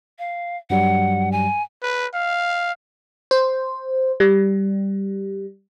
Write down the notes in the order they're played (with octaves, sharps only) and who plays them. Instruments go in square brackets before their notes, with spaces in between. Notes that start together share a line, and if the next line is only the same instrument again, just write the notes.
[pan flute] F5
[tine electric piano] G2 F#3 G3 [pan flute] F#5
[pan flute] G#5
[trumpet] B4
F5
[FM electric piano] C5
G3